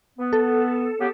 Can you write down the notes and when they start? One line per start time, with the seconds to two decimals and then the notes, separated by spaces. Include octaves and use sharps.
0.18 B3
0.33 A4
1.00 C#3 B3 G4